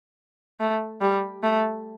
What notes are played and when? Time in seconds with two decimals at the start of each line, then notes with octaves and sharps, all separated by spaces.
0.60 A3
1.01 G3
1.43 A3